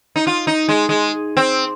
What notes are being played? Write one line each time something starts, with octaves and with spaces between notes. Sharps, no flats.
D#4
F4
D#4
G#3
G#3
C4